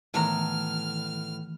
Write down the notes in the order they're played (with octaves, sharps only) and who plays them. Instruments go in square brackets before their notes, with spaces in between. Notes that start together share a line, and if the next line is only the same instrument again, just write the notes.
[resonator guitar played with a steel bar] A2 B3 A#5 [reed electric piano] D#3 E3 A3 [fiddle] F6